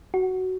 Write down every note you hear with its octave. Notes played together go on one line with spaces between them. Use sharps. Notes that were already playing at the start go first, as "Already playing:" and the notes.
F#4